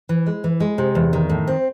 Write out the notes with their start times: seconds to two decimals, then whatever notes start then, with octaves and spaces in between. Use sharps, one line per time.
0.09 E3
0.26 G#3
0.44 E3
0.60 G#3
0.78 C3
0.95 E2
1.13 D#3
1.30 A2
1.48 C4